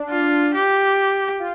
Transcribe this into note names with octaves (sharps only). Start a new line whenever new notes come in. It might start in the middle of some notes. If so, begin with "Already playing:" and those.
Already playing: D4
F4
G4
F4